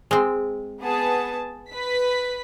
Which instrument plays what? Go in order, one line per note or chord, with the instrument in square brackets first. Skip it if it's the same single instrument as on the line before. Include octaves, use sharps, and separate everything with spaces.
[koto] G#3 C4
[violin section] B3 G#4 A5
B4 B6